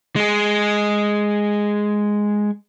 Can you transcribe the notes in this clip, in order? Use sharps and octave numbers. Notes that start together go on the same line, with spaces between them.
G#3 G#4